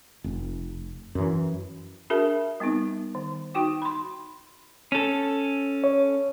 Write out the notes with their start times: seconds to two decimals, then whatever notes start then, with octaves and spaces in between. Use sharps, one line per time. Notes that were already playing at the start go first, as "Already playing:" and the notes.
0.24 F1
1.15 F#2 E3
2.10 D4 F#4 G#4 A#4 E5 A5
2.60 G3 B3 C4 D#4
3.15 D#3
3.54 D#4 F#4 G5 D6
3.82 B5 C6
4.92 C#4 A4
5.84 C#5